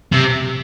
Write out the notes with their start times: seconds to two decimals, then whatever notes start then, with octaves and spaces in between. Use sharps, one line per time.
0.13 C3